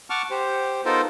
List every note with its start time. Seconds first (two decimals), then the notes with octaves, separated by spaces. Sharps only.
0.10 F#5 A5 C#6 D6 F6
0.31 G4 C5
0.85 B3 D#4 F4 A4 A#4 C5